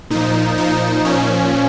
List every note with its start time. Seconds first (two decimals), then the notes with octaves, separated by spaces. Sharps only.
0.10 A#2 F3 D#4
0.58 A#2 F3 D#4
1.05 A#2 F3 C#4